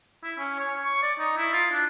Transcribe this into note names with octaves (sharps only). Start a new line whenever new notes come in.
E4
C#4
C#5
C#6
D5
D#4
E4
F4
D4